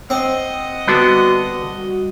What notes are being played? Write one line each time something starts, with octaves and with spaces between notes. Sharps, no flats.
C4 D#5 F#5
D3 G3 B3 D4 F#4